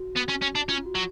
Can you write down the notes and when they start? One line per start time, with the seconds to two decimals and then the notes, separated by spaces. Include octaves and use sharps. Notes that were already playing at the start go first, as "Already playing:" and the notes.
Already playing: F#4
0.17 B3
0.29 C#4
0.42 C#4
0.55 D4
0.69 C#4 F4
0.86 F#4
0.95 F#3